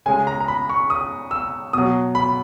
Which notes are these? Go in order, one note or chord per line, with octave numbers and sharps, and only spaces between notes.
C#3 G#3 G#5
A#5
A#5
B5
C#6
D#6
E6
B2 F#3 D#6
B5